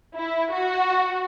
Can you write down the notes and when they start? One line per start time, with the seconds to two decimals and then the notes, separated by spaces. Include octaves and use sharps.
0.17 E4
0.54 F#4